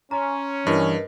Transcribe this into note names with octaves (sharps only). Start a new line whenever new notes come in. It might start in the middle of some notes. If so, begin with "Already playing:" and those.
C#4 A#5 C6
G2 E3 A#4 B4 D#5